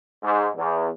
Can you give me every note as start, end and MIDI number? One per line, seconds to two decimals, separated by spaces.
0.22 0.48 44
0.56 0.87 40